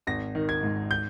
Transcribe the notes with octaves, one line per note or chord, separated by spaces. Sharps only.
G#1 A#6
D#3
G#6
G#2
G6